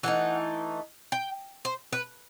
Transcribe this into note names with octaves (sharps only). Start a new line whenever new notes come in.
E3 A3 D#4 F#5
G5
C5
B4